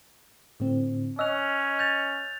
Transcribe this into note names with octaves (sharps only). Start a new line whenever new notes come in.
A2 D3 C4
C#4 D#5 E6 F#6 F7
G6 A6 F7